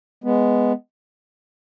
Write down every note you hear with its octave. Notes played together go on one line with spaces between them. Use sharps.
G#3 B3